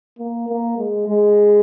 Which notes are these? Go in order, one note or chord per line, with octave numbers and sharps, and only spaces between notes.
A#3
A#3
G#3
G#3